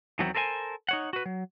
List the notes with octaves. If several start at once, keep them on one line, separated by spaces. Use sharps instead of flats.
E2 D#3 E3 F#3 B3 C4
A4 A#4 C5 E5 G#5
D#4 C#5 F#5
F#4 B4
F#3